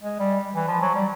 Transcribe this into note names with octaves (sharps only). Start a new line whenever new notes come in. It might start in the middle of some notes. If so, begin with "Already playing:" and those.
G#3
G3
E3
F3
F#3
G3